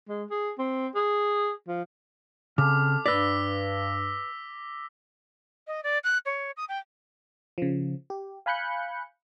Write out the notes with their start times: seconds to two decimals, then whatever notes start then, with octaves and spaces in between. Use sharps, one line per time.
0.09 G#3
0.30 G#4
0.58 C4
0.95 G#4
1.67 F3
2.58 C#3 C4 A4 D6 F6
3.06 G2 B4 D5 E6 A#6 B6
5.67 D#5
5.84 D5
6.04 F#6
6.26 C#5
6.57 D#6
6.69 G5
7.58 C#3 F3
8.10 G4
8.46 F5 G#5 B5 F#6 G6 C#7